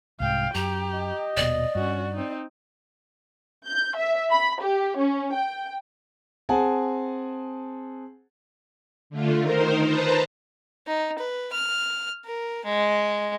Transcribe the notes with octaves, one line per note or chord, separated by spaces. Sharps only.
C2 G#2 F5 G5
F#2 G4 A#5
D#5
D#1 B2 D5
G2 C#4 F#4
C4 D#4
G6
E5
B5
G4
C#4
G5
C4 G#4 F#5 G#5 A5
D3 A3 F4
D#3 D#4 A#4 C5
B4 C5 A5 A#5
D#4
B4
F6
A#4
G#3